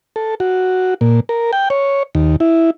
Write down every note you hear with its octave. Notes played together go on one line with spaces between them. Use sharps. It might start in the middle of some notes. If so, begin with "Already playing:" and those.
A4
F#4
A#2
A#4
G5
C#5
D#2
E4